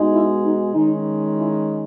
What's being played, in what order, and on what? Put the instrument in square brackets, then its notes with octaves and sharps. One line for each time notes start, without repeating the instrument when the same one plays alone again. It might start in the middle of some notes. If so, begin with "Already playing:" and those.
Already playing: [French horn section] B2 G#3 D#4
E4
D#4
D#3 G#3 C#4 D#4
E4